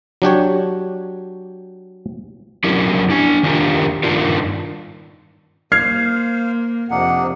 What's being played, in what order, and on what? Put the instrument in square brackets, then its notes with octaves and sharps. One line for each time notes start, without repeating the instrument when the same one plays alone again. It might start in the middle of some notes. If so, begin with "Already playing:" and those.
[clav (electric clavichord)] F#3 D4 G4 C#5
[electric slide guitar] F#3 C#4 D4 E4 G4 A#4
D4 G#5
D#3 D4 F4 G4 A#4
G2 D#3 D4 D#4 F4 A#4
[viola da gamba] A#3 [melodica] C5 F5 [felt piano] F6 G#6 C7
[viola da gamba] F2 [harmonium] C3 F#5 [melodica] A#3 D4 D#4